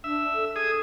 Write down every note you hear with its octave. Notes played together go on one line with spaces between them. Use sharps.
D4 E5
A4
G#4 D#6